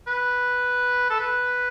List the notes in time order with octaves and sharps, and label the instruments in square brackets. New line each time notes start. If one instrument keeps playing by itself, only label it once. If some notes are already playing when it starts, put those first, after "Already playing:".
[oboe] B4
A4
B4